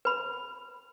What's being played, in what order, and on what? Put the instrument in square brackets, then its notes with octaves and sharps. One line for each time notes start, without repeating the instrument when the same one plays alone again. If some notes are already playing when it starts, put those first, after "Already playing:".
[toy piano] B4 B5